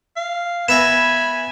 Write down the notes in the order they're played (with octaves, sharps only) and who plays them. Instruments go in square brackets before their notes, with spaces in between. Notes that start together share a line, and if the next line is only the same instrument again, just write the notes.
[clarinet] F5
[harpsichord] B3 E5 A#5 [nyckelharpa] G#5 [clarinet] B5 [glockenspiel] E7